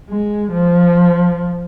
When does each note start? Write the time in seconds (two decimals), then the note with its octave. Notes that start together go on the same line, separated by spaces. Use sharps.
0.10 G#3
0.52 F3